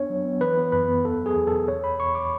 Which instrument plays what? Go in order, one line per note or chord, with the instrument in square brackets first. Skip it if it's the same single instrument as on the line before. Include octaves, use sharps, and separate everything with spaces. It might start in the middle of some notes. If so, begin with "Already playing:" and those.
Already playing: [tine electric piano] B3 D4 C#5
F#3
B3
E3 B4
B3
F#2 B4
B3
E2 A4
F#3 G#4
E2
B2 A4
E2 C#5
E2 B5
E2 C#6
D6